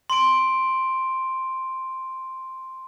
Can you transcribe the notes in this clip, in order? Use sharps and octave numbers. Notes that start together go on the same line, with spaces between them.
C6 D7